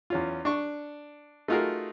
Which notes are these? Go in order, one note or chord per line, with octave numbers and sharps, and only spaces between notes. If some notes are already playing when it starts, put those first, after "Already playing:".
E2 C#4 F4
D4 C#6
A3 D#4 F4 F#4 G#4 A#4